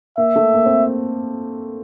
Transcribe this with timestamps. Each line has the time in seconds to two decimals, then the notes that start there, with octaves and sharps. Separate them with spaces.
0.18 A#3 E5
0.36 A3
0.54 A#3
0.66 C4